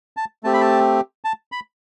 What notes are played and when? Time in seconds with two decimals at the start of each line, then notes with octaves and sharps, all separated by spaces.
0.17 A5
0.44 A3 C4 G4 A5
0.53 B5
0.61 A5
1.24 A5
1.52 B5